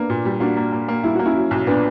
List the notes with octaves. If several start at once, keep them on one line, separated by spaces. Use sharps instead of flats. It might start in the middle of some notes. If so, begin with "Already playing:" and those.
Already playing: A#3 B3 D4
A#2
G3
A#3 D4 F#4
A#3
A#3
A#3
G3 E4
A#3 F#4
C#4 E4
F#3
B1
A#2 B3 D4